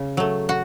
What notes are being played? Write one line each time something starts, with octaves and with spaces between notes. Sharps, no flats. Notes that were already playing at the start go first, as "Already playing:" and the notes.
Already playing: C#3
F#3 A3
F#4